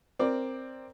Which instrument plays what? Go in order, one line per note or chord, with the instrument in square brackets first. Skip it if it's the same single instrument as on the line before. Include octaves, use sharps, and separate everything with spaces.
[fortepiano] C4 A#4 D5